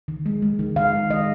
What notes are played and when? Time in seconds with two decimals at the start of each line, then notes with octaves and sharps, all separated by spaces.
0.08 D#3
0.26 G#3
0.42 G#3
0.59 D#3
0.76 D#3 F5
0.94 G#3
1.10 G#3 D#5